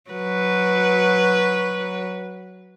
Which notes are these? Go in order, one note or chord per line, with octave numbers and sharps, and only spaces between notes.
F#3 B4